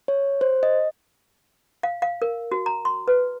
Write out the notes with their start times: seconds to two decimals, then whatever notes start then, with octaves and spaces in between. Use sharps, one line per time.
0.08 C#5
0.41 C5
0.63 D#5
1.83 F5
2.02 F5
2.22 A#4
2.52 F#4
2.66 A#5
2.85 C6
3.08 B4